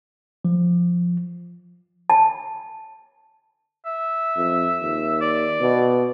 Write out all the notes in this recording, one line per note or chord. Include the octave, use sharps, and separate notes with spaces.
F3
A5
E5
F2
D#2
D5
B2